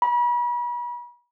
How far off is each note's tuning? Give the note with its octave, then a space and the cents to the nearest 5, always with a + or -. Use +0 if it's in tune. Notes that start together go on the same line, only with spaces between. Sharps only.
B5 -40